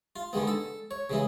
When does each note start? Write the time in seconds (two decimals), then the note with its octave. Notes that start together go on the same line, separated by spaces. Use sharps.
0.16 F4
0.33 D3 D#3 G#3 B3
0.47 A4
0.91 C#5
1.10 C#3 E3 G#3